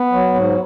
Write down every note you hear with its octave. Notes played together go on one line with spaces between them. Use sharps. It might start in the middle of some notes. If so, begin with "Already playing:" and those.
Already playing: B3
F#3
G#2